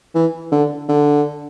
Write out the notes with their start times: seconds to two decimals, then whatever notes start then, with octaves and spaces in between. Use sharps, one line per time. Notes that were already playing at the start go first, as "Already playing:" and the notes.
0.15 E3
0.52 D3
0.89 D3